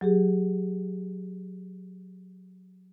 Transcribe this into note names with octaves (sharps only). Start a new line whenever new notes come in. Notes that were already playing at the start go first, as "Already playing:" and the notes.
F#3 G4 G#4